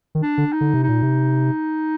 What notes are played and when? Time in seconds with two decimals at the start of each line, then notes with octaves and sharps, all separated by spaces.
0.15 D#3
0.23 D4
0.38 D3
0.52 D#4
0.61 D3
0.74 C3
0.83 D#4
0.88 A#2
1.02 C3